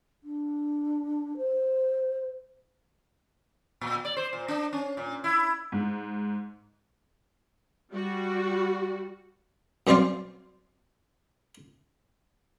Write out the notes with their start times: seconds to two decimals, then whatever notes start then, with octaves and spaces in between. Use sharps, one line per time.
0.23 D4
1.37 C5
3.81 A#2
4.05 D5
4.17 C5
4.33 A#2
4.48 D4
4.73 C#4
4.97 A#2
5.24 E4
5.72 G#2
7.92 G3 F#4
9.87 F#2 G3 C4 C5 D5 F5